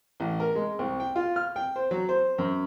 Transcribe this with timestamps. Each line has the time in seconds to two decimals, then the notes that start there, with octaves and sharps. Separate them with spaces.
0.20 A1
0.40 A#4
0.55 G#3
0.79 C2
1.00 G5
1.16 F4
1.36 F6
1.56 G5
1.76 C5
1.91 F#3
2.09 C5
2.38 F#2